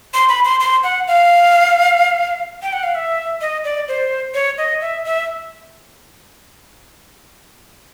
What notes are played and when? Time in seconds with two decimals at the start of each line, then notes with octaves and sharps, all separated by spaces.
0.14 C6
0.29 B5
0.45 C6
0.60 C6
0.83 F#5
1.08 F5
2.62 G5
2.73 F#5
2.83 F5
2.95 E5
3.41 D#5
3.64 D5
3.88 C5
4.34 C#5
4.58 D#5
4.81 E5
5.05 E5